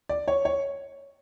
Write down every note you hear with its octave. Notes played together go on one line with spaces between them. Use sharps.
D5
C#5
C#5